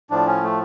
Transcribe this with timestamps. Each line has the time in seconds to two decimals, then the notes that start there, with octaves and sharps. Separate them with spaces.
0.10 A2 F3 D4
0.27 C#4
0.43 A3